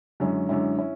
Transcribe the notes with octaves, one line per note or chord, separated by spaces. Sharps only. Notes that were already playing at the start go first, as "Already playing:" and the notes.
F#2 D3 G#3 C#4 E4
F#2 D3 G#3 C#4 E4
C#4 E4